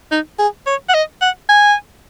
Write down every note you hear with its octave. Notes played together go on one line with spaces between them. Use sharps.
D#4
G#4
C#5
F#5
D#5
F#5
G#5